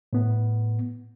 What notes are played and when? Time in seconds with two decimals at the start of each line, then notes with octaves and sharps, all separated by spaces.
0.13 A2 B3